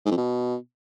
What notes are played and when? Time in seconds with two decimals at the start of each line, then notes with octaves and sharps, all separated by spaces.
0.06 G#2
0.12 F2
0.17 B2